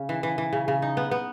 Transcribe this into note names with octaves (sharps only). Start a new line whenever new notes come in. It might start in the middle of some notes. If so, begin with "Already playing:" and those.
Already playing: C#3
E3
E3
E3
C#3
C#3
D#4
B3
B3